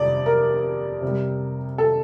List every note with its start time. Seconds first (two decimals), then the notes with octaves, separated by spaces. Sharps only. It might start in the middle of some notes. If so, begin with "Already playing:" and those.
Already playing: F2 C3 G3 D5
0.26 A#4
1.02 C3 G3
1.78 A4